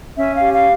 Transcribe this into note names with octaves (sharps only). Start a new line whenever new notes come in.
C#4 E5
F5
G4
F5